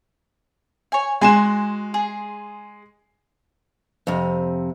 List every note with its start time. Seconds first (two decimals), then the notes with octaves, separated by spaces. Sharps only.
0.92 C#5 G#5
1.21 G#3 F#4 G#5 C6 E7
1.94 G#4
4.07 F2 C3